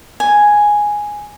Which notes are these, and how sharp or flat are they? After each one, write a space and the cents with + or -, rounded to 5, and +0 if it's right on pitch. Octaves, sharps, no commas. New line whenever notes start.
G#5 +0